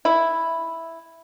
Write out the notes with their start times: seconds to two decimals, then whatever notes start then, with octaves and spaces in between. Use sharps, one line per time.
0.05 E4